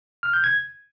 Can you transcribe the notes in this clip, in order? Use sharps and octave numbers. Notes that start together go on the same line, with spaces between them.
F6
G6
G#6